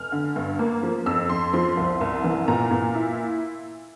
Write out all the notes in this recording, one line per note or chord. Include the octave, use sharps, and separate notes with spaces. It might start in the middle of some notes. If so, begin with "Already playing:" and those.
Already playing: F1 F6
D3
G2
A#3
F3
F2 E6
F2 C6
F3 C6
C2
C2
E3
A#2 A#5
A#2
E4